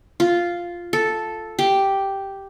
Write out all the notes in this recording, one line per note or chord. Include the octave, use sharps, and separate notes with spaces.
F4
A4
G4